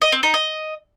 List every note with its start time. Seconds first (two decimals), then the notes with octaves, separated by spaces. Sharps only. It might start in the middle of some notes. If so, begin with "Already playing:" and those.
0.02 D#5
0.12 C4
0.23 D#4
0.34 D#5